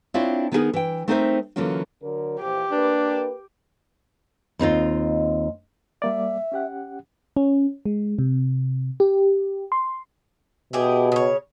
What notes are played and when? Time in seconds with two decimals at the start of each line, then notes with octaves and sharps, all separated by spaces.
0.14 C4 D4 E4 F4 C#5 D5
0.52 D#3 B3 D#4 F4 G#4 A#4
0.74 E3 G5
1.08 A3 C4 D#4 A#4 C5 E5
1.56 D3 E3 F#3 A#3 C#4 F4
2.02 D3 F#3 A#4
2.41 A#2 E3 F3 G4
2.71 A#3 D4 A#4 B4
4.59 D#2 C4 D#4 F4
6.02 G3 A#3 D5 E5
6.52 C#4 G4 F#5
7.36 C#4
7.86 G#3
8.19 C3
9.00 G4
9.72 C6
10.73 B2 E4 G4 G#4
11.12 C#3 C#5